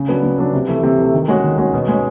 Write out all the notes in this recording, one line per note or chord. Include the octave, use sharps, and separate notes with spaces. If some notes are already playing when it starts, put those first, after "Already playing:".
Already playing: C#3
F#3 B3 D4
C#3
F#3 B3 D4
C3
E3 A3
C3
E3 A3
D#3
G#3 C#4 F#4
D#3
G#3 C#4 F#4
B2
G#3 C#4